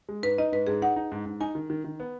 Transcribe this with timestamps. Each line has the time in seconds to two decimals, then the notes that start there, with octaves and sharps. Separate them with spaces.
0.09 G#3
0.23 G#2 B4
0.38 D#4 D#5
0.52 G#2 B4
0.67 G#2 G#4
0.82 D#4 F#5
0.96 D#4
1.12 G#2
1.26 G#2
1.40 D#4 G#5
1.55 D#3
1.70 D#3
1.84 D#3
2.00 B3